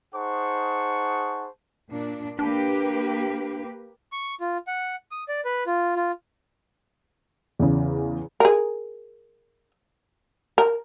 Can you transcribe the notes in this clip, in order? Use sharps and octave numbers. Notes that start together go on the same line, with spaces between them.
D#4 G#4 C5 F#5 A5 C#6
A#2 D4
A#3 D4 G4 B4
C#6
F4
F#5
D#6
D5
B4
F4
F4
E2 C#3
G#4 A#4
A#4